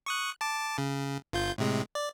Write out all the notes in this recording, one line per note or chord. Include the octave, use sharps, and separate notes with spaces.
C#6 D#6 F#6
A5 D6
C#3
G1 F4 G6
A2 C3 G#3
D5